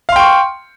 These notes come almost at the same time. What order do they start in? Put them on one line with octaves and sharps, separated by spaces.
F5 C6 G5 C#6